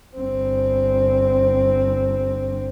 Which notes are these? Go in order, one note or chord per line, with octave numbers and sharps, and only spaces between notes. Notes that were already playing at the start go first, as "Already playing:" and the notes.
G1 C4